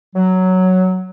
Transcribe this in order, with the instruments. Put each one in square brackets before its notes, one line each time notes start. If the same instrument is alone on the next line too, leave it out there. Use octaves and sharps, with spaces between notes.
[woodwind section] F#3